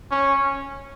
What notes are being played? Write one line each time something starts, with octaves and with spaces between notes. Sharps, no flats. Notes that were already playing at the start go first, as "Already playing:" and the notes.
C#4